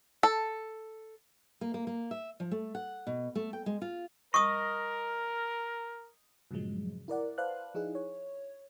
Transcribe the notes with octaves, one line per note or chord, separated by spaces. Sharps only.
A4
A#3
A#3
A#3
E5
F3
A3
F#5
B2
A3
G5
G#3
F4
A#4 D#5 C#6 D#6
G2 A#2 C#3 F3 F#3 G#3
E4 A#4 D5 F#5
B4 C5 D5 F5 A5 F#6
F3 D#4 E4 G#4
C#5